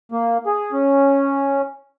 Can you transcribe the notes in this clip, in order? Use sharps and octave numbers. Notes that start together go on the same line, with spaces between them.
A#3
G#4
C#4